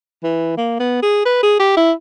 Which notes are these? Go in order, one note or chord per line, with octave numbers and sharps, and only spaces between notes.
E3
A#3
B3
G#4
B4
G#4
G4
E4